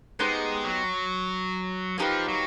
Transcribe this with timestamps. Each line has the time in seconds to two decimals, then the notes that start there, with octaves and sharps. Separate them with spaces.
0.19 G#3 B3 D#4 G4 C5
0.64 F#3
1.98 F3 A#3 D#4 G4 B4
2.28 F#3